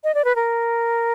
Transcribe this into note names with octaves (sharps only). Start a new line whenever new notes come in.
D#5
D5
B4
A#4